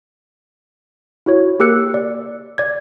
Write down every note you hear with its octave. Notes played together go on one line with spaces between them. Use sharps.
E4 F#4 C#5
A#3 G4 A#4 E6 F#6 C#7
D5
D5 G#6